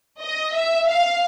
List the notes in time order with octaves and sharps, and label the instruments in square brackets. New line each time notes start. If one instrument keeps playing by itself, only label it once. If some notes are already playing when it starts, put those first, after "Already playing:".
[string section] D#5
E5
F5